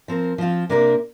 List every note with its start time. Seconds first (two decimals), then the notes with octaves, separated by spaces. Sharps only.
0.08 F3 C4 A#4
0.38 F3 C4 F4
0.70 C3 A#3 D4 A#4